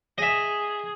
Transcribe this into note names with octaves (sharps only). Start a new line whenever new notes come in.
G#4 D#5 E5